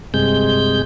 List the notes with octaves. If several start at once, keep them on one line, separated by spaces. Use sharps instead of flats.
G2 C3 G#3 G6